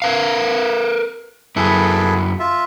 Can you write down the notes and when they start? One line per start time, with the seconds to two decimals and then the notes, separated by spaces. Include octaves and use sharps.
0.02 A#4 B4 F5
1.56 F#2 E4 G#4 A4 B4
2.39 F4 E5